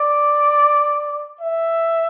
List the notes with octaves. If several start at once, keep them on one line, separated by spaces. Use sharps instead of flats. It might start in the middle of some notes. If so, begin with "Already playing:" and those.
Already playing: D5
E5